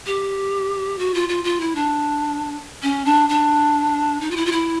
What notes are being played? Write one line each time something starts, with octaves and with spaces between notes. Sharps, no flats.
G4
F#4
F4
F4
F4
E4
D4
C#4
D4
D4
D#4
F4
E4
F4
E4